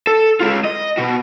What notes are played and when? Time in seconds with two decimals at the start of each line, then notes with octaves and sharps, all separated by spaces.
0.07 A4
0.41 G#3 F4
0.65 D#5
0.98 B2 F#4